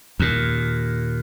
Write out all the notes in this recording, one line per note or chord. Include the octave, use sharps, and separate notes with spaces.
D#2 A#2